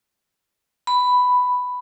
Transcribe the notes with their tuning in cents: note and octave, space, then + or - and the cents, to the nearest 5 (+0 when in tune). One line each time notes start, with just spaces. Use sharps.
B5 +5